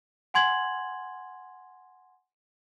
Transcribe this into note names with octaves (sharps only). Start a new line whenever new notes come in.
F#5 G#5 C6 G#6 F#7